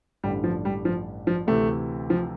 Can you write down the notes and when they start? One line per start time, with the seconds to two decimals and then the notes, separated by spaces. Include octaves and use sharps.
0.24 A1 G2 D3 G3
0.44 F3
0.65 G3
0.85 F3
1.27 F3
1.47 D2 C3 E3 A3
2.10 F3